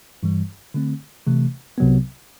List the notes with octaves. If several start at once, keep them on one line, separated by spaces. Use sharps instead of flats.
G2 E3 G3
D3 A3 C4
C3 E3 A3
C2 C3 F#3 B3